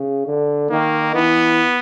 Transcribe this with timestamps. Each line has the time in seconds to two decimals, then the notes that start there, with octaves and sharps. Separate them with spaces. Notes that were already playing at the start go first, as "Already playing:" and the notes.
Already playing: C#3
0.26 D3
0.70 D#3 A#3
1.15 E3 B3